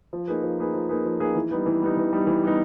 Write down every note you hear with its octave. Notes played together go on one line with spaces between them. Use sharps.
F3
A#3 D#4 G#4 B4
F3
A#3 D#4 G#4 B4
F3
A#3 D#4 G#4 B4
F3
A#3 D#4 G#4 B4
E3
G3 B3 D#4
E3
G3 B3 D#4
E3
G3 B3 D#4
E3
G3 B3 D#4